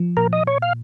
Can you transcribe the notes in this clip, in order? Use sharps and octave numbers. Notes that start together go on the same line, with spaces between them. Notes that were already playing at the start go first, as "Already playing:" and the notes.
Already playing: F3
A#2 A#4
D#5
A#2 C#5
F5